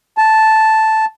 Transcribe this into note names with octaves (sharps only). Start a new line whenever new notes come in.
A5